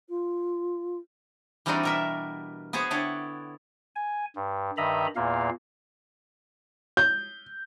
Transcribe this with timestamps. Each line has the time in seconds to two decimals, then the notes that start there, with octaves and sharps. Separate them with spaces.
0.09 F4
1.66 E3 G3 C4 D4 D#4 F#4
1.83 B2 A#4 E5
2.73 B3 F#4 G#4 C5 C#5
2.91 D3 E4 A4 C#5 F#5 G5
3.96 G#5
4.36 G2
4.77 G2 D#3 D#5 E5 A#5 B5
5.16 E2 A#2 A#3 F5
6.97 G6